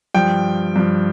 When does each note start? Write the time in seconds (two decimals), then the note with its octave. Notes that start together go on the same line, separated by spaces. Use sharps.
0.14 G2 F3 G5
0.76 G2 F3